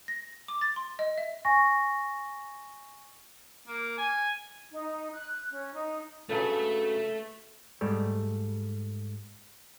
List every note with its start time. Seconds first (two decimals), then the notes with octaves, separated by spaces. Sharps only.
0.08 A#6
0.48 D6
0.61 A6
0.76 C6
0.99 D#5
1.18 E5
1.45 G#5 C#6 A#6
3.68 A#3
3.98 G#5
4.71 D#4
5.14 F#6
5.51 C#4
5.74 D#4
6.29 G2 C#3 F#3 A3
7.81 G#2 G3 A3